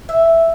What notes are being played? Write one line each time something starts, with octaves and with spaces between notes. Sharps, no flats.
E5